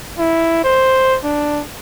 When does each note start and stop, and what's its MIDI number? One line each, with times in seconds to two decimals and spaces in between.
0.19 0.63 64
0.64 1.17 72
1.24 1.62 62